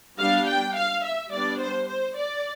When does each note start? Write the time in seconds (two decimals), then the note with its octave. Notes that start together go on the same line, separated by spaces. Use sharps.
0.19 G3 B3 D4 F5
0.47 G5
0.74 F5
1.03 E5
1.31 G3 B3 D4 D5
1.59 C5
1.87 C5
2.15 D5